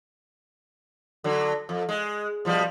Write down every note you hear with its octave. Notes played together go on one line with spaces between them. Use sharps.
D3 F#3
F2
G#3
B2 F3 G3